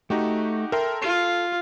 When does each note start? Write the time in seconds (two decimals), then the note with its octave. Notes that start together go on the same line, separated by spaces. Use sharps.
0.10 A3 D#4 F#4 G4
0.72 A4 A#4 E5 G5 C6
1.02 F4 C7